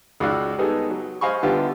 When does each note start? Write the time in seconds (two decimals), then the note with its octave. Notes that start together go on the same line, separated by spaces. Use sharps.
0.20 C#2 F#4 D5 F5 E6 F#6
0.58 G3 G#3 B3 D#4 G#4 A4
0.90 F#3
1.21 C5 D#5 F5 G#5 B5 C#6
1.43 D3 G3 B3 E4 F4 G4